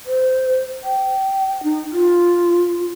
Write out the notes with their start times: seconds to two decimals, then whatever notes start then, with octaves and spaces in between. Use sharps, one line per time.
0.06 C5
0.83 G5
1.63 D#4
1.92 F4